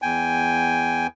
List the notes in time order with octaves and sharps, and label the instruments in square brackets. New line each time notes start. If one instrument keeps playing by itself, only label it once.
[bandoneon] E2 G5 G#5